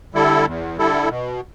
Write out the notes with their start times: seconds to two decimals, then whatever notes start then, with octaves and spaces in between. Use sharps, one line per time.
0.14 D3 G3 E4 A4
0.45 E2
0.77 D3 G3 E4 A4
1.09 B2